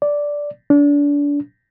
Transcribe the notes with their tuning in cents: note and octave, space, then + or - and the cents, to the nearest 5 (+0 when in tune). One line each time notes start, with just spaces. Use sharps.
D5 -5
D4 -30